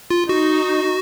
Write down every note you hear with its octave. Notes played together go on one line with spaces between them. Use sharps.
F4
D#4 F#4